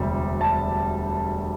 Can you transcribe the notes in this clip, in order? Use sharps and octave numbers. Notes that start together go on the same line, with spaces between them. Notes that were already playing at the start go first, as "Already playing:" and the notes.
Already playing: E1 D2 C3 G3
A5